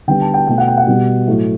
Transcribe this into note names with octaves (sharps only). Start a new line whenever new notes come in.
D3 G3 B3 G5
A5
G5
B2 A3 G5
F#5
G5
F#5
B2 G3 B3
A2 F#3 A3